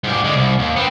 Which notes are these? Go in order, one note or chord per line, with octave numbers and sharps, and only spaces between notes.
G#2 G4
D3 G#3
C2
D#2
B3 C4